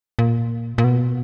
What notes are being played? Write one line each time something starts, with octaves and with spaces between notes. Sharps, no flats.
A#2
A#2
B2